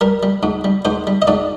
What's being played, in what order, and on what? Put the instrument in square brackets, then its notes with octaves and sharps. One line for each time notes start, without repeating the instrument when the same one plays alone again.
[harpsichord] G3 A#4
G3
G#2
G3
G#2 C5
G3
D#5
G#2 D5